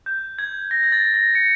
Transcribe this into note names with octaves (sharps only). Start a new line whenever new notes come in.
G6
G#6
A#6
G#6
A6
A#6
C#7